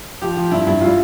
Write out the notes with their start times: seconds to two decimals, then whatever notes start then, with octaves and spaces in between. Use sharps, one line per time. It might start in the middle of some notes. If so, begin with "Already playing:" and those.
0.22 F3 G4
0.37 F3
0.51 G2 E4
0.67 G2 E4
0.81 G3 F4